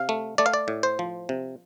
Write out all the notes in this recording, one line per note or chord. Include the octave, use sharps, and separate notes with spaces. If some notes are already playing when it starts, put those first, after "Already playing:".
Already playing: C3 F5
A3
A3 D5
F5
D5
A2
C5
F3
C3